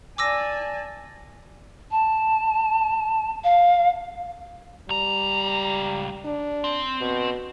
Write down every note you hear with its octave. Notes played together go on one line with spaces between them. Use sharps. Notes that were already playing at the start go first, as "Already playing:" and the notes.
D5 G#5 A5 D6 E6 A#6
A5
F5
C#2 G3 A#5
D4
C4
B2